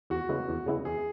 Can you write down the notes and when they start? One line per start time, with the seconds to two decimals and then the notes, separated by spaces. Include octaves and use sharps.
0.10 E2 F#4
0.29 C#3 G#3 B3 E4
0.49 E2
0.66 C#3 G#3 B3 E4
0.85 E2 G#4